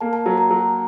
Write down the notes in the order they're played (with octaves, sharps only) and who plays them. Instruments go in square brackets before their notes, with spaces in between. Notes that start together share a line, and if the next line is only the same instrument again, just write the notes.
[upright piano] A#3 [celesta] A5
[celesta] A5
[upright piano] F#3 [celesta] A#5
[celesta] A#5
[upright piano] F#3